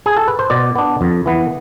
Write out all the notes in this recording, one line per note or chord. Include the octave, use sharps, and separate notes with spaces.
G#4
A4
B4
C5
B2 D5
B3 D4
F2
E3 B3